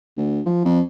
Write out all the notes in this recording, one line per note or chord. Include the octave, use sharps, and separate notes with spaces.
D2
F3
F2